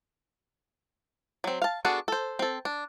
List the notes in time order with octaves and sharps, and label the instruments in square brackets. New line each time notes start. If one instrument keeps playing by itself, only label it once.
[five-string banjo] F#3 C4
F5 A5
B3 D4 F#4 G#4 A4
A4 C5
C4 A4
D4